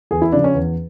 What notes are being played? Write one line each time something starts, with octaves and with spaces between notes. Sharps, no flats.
E2 G#4
E4
C#3 F3 D4
C#4
E2